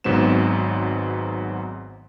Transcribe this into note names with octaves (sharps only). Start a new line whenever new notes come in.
G#1 G#2 F#3 B3 C4 E7